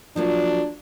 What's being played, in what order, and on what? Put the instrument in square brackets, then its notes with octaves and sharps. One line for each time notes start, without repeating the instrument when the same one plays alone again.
[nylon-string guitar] F3 F#3 A#3 [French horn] D4